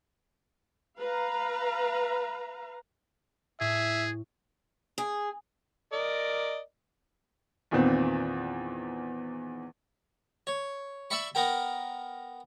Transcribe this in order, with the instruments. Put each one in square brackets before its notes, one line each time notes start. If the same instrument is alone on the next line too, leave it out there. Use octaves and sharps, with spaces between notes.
[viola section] B4 F5 A#5
[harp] A2 [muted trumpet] G#4 [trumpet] E5
[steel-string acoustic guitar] G#4
[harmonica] A#4 D5 D#5
[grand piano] E2 A#2 D#3 B3 C4
[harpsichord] C#5
D5 E5 B5 C#6
B3 A#4 G5